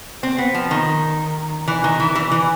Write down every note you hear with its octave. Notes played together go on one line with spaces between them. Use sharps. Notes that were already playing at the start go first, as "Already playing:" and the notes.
C4
B3
F3
D#3
E3
D#3
E3
E3
E3